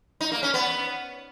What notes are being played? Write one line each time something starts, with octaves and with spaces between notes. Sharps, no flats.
D#4
A#3
C#4
B3